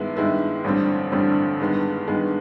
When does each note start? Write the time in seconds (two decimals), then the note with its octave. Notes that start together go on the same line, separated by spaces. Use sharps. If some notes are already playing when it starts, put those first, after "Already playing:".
Already playing: G2 D#3 G#3 B3 E4
0.17 G2 D#3 G#3 B3 E4
0.64 A1 G2 D3 G3 C4
1.12 A1 G2 D3 G3 C4
1.60 G2 D#3 G#3 B3
2.08 G2 D#3 G#3 B3